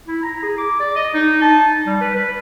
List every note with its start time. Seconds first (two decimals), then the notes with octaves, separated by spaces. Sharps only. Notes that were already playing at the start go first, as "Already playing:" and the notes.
0.07 E4
0.23 A#5
0.43 G#4
0.58 D6
0.80 D5
0.96 D#5
1.14 D#4
1.42 A5
1.87 G3
2.01 B4
2.15 B4